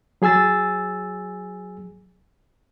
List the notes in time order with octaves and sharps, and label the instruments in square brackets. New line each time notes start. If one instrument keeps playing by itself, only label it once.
[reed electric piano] F#3 G#4 G#5 E6 A6